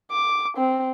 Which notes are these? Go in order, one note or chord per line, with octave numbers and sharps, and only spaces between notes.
D6
C4